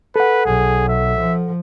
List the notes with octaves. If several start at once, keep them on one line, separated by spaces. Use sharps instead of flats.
A4 B4 F#5
B1 G#4
E5
F3